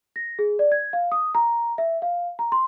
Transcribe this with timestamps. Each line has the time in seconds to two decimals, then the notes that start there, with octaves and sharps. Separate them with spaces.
0.16 A#6
0.39 G#4
0.59 D5
0.72 G#6
0.93 F5
1.12 D#6
1.35 A#5
1.78 E5
2.02 F5
2.39 A#5
2.52 C6